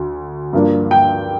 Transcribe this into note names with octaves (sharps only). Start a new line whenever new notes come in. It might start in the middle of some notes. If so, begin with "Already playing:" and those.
Already playing: D2 D3
G2 F3 A#3 D4
G5